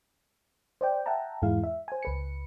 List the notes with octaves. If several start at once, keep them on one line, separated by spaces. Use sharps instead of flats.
C5 D5 G5
E5 F#5 G5 A5 A#5
E2 G#2 G#3 E4 F5
E5
C5 G#5
C#2 B4 C#7